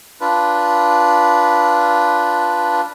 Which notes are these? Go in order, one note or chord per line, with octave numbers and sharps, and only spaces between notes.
D4 F4 B4